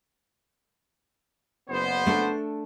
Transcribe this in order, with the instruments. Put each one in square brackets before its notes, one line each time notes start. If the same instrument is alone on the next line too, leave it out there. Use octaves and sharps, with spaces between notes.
[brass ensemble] F#1 B3 C5
[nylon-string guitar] A3 D4 A4